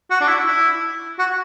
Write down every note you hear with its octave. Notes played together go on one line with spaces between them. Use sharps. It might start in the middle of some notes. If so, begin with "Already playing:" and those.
F#4
D4
E4
E4
F#4